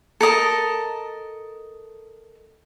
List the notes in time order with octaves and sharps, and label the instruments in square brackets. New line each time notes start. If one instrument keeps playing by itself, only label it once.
[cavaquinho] A4 A#4 D#5 A5